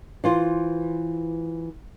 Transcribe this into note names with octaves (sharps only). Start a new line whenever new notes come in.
E3 F4 C5